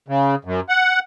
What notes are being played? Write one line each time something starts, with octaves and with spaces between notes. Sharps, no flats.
C#3
F#2
F#5